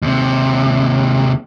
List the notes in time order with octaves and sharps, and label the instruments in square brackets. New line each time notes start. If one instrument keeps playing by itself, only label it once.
[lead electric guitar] D#2 C3